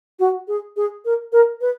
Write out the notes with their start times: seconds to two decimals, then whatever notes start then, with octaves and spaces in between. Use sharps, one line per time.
0.19 F#4
0.48 G#4
0.76 G#4
1.05 A#4
1.32 A#4
1.61 B4